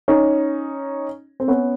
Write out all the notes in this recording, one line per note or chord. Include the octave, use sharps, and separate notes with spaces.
C#4 D#4
C4
B3 C#4